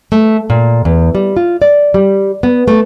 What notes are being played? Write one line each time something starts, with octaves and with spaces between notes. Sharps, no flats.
A3
A#2
E2
G3
F4
D5
G3
B3
A3